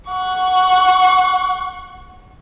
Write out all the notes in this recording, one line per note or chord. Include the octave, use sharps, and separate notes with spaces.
F#5 C#6